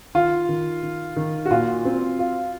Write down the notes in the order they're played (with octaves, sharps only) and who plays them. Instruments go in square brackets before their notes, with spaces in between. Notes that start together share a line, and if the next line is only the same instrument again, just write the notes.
[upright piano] D#3 [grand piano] F4
[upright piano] D#3
D#3
D#3
[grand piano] F#4
[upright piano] A#2 [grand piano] F4
[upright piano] C4
F4